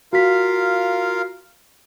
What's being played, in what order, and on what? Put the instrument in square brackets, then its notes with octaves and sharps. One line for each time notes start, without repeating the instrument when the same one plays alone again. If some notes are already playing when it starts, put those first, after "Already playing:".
[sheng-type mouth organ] F4 A#4 F5 [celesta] F#4 B6